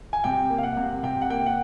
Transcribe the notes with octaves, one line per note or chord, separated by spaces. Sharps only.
G#5
C3 G5
A#3
F5
F#5
C3
C3 G5
F#5
A#3 G5
F#5